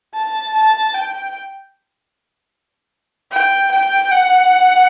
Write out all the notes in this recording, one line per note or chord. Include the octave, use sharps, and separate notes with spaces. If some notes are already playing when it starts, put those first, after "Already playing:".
A5
A5
G5
G5
G5
F#5